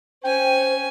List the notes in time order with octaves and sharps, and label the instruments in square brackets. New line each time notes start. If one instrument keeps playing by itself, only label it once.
[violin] C#4 G#5 [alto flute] C5 [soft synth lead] G5